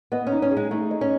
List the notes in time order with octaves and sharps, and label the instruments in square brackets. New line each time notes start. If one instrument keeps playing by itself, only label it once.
[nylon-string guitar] B3 [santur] D#5
[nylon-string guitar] C#4
[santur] D#4
[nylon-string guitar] C#4
[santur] G#4
[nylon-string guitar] G#3
[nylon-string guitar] A3 [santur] D#4
[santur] D#5
[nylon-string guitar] C#4